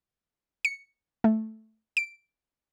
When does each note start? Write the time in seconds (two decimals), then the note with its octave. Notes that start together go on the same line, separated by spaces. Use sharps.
0.65 C#7
1.24 A3
1.97 D7